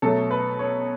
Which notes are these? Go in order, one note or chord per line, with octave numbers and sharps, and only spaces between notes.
B2 F#3 A3 A4
B4
C#5